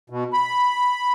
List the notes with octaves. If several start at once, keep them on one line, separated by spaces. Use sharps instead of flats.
B2
B5